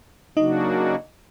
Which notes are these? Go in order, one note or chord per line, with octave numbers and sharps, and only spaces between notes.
C#3 F#3 A#3 D4 D#4 F#4 D#5